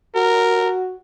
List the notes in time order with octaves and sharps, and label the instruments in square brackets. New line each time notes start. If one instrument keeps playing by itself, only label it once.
[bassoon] F#4 [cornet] A#4